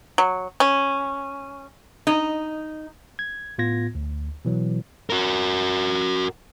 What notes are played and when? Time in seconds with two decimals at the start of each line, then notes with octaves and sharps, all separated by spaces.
0.18 F#3
0.60 C#4
2.07 D#4
3.19 G#6
3.58 A2 B3 F4 G#6 A#6
3.95 D2
4.45 B2 E3 F#3
5.10 F#4 A#4